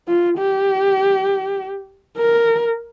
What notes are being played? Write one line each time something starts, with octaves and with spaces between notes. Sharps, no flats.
F4
G4
A#4